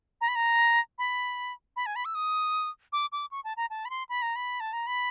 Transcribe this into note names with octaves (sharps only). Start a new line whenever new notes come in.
A#5
B5
A#5
B5
B5
G#5
B5
E6
D#6
D6
D6
C#6
A5
A#5
A5
B5
C6
B5
A#5
B5
A5
A#5
B5